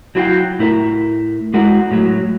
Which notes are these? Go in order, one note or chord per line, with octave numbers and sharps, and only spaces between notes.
F#3 E4 F#4 D#5 F5 G5
A2 E4 A#4 E5
G#3 E4 F#4 G#4 A#4
A2 F#3